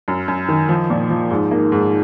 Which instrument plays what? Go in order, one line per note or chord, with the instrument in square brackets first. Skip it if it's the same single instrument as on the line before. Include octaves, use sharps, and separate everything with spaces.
[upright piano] F#2
F#2
D#3
F3
A#2
F3
[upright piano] G#2 [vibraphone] D#4
[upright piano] A#3
G#2